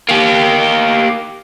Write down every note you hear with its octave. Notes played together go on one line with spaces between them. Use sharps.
A#3 G4